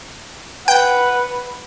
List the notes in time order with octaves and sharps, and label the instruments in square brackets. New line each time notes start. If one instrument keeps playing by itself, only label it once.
[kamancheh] B4 [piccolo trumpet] F#5 [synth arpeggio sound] G5